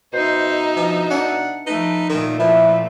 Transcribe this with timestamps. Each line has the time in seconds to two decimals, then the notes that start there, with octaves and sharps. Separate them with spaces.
0.13 B2 D#4 C5 E5
0.77 F3 D4
1.10 D4 F#5
1.67 F3 A3 D#4 B4
2.09 A#2 D#3 A3
2.40 F3 E4 B4